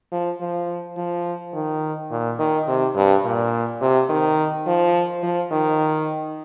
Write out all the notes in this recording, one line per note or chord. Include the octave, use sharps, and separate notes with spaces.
F3
F3
F3
D#3
A#2
D#3
C3
G2
A#2
C3
D#3
F3
F3
D#3